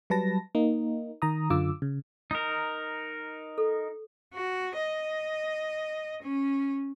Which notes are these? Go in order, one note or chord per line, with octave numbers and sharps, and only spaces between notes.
F#3 G3 B4 A5 A#6
A#3 D#4
D#3 A#5 D#6
F#2 D3 F4 D6 E6
C#3
D#4 A#4
A4
F#4
D#5
C#4